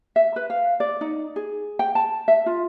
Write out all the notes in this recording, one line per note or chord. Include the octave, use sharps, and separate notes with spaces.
E5
B4
F5
D5
D#4
G#4
G5
A5
E5
F4